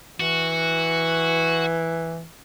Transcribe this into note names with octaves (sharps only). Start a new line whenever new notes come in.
E3 F#4